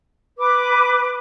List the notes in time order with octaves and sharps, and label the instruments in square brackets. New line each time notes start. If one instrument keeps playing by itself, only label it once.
[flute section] B4 D6